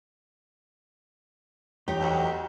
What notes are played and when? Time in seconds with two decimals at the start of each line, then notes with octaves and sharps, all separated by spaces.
1.88 E2 D#4 G4 C#5
2.00 D2 F#3